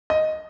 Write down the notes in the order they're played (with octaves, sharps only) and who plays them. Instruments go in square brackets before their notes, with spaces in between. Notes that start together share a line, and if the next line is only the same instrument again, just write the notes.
[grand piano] D#5